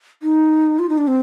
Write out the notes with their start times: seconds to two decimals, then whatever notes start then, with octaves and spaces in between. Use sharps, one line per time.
0.23 D#4
0.79 F4
0.89 D#4
0.98 D4
1.07 C4